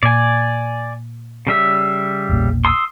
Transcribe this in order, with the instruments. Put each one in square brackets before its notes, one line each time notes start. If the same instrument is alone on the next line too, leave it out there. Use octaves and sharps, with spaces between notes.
[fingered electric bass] A#2 [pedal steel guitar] D5 G#5
[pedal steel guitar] C#3 G3 E5
[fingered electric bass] E1 A#1 A#2
[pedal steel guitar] C6 D#6 E6